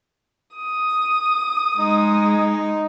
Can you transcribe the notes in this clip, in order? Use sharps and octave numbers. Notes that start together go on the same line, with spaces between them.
D#6
G#3 D#4